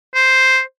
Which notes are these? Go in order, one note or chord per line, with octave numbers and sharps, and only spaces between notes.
C5